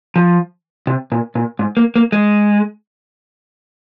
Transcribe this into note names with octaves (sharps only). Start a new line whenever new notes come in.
F3
C3
A#2
A#2
G#2
A#3
A#3
G#3